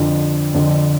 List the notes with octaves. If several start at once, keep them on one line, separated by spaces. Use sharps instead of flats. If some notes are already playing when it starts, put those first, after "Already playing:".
Already playing: F2 D3 F3 D4
F2 D3 F3 D4